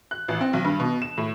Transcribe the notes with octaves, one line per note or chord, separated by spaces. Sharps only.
F#6
A1
C4
B1
G2
B2
E7
A2